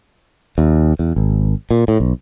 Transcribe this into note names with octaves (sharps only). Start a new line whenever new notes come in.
D#2
E2
G#1
A#2
A2
B1